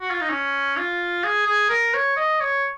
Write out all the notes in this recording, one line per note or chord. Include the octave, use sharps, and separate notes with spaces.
F#4
F4
D#4
C#4
F4
G#4
G#4
A#4
C#5
D#5
C#5